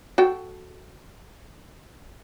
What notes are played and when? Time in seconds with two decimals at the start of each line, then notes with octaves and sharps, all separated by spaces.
0.18 F#4 A4 G5